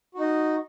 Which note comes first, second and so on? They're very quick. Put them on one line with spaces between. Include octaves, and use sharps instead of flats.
F#4 D#4 D#5